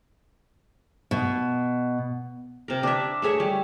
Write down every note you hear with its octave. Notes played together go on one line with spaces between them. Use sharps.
B2
C3 A#4
D4 E5
A3 G#4 C#5 E5
G3